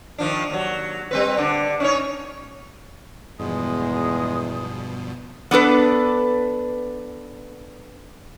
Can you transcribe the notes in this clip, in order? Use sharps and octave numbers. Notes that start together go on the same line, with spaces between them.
D#3 F3 D4
D#2 F#3
G3 C4 B4
D3 D4
C#4 D#4 C#5
E2 G2 B2 D#3 F3 G#3 D#6
B3 D4 A4 B4